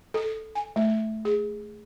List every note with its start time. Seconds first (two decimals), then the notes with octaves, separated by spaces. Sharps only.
0.14 A4
0.55 G#5
0.76 A3
1.25 G#4